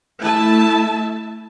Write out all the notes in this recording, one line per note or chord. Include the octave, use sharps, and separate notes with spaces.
A3 E4 E5 A5